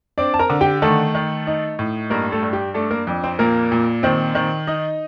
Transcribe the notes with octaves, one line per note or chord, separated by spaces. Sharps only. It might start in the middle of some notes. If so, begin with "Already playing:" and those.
C4 D4 D5
A5
A#4 A#5
D3
G4 G5
D#3 A3 A4
D#3
D#4
A2
G2 A#3 A#4
A3 A4
G2
G4
A3 D4 A4
A#3 A#4
F2
C4 C5
A#2 A#3 A#4
A#2
D#3 C4 C5
D#3
D#4 D#5